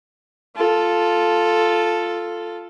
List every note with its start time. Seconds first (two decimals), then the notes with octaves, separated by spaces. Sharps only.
0.56 F4 A4